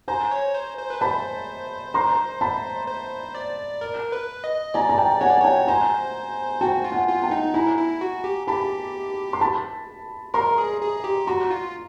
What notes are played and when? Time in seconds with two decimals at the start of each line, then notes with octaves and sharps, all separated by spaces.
0.08 C5 G#5 A#5
0.31 C#5
0.54 C5
0.78 C5
0.90 B4
1.01 C5 A5 B5
1.94 A#5 C6
2.41 A5 B5
2.88 C5
3.35 D5
3.81 A#4
4.12 B4
4.44 D#5
4.74 D5 G#5 A#5
4.89 A#5
4.98 G5 A5
5.21 C#5 F#5 G#5
5.30 D5
5.40 C#5 G5 A5
5.68 C5 G#5 A#5
6.61 F#4 G5 A5
6.84 F4
6.92 F#5 G#5
7.08 F4
7.23 G5 A5
7.31 D#4
7.54 E4 G#5 A#5
7.78 E4
8.01 F#4
8.24 G4
8.47 G4 A5 B5
9.33 C6
9.41 A5 B5
10.34 A#4 A#5 C6
10.58 G#4
10.81 G#4
11.04 G4
11.27 F#4 A#5 C6
11.51 F4